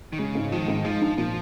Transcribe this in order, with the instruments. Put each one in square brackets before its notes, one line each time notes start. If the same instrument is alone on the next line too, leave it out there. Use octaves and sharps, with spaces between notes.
[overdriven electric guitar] D#3
[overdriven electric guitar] C#3 [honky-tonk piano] G#3
[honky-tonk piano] G#2
[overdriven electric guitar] D#3 [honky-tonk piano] F3
[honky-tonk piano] G#2
[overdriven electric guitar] F3 [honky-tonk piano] G#3
[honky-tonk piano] D#4
[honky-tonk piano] A#2 [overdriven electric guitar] F3